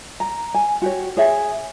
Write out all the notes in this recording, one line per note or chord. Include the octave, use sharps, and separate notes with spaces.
A#5
G#5
F#4 G4 C#5
G#4 C#5 E5 G#5